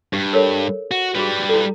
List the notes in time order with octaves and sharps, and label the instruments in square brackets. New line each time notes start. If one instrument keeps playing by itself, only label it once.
[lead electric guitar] G2 [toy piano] G4
[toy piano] A4 A#4 C#5
[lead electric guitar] F#4
[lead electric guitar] G3 B4 [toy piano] F4 F#4 G#4
[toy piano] E4 A4